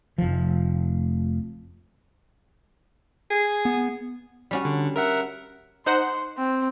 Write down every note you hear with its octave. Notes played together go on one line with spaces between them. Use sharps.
F1 F3
G#4
B3
G3 C#4 F#4
D3
A#4 E5 F#5
D#4 C5 F#5 C6
C4